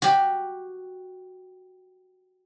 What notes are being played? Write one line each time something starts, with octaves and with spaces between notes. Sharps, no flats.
F#4 G4